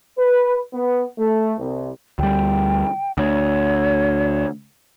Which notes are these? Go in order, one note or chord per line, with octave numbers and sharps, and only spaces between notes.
B4
B3
A3
C2
D2 G3 G5
D2 C#5